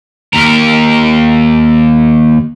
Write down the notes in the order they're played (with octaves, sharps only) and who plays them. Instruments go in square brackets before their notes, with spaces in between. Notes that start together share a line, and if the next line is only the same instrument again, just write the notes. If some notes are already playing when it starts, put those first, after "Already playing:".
[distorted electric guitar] D#2 A#4